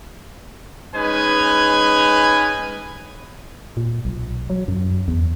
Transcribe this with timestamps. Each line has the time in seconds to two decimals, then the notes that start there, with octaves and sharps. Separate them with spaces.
0.94 G#3 C#4 D#4 B4 G#5
3.77 A#2
4.05 B1
4.50 F#3
4.68 F#2
5.08 E2